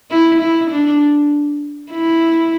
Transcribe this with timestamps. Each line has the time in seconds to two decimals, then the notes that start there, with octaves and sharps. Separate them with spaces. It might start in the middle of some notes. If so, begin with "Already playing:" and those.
0.11 E4
0.40 E4
0.71 D4
1.92 E4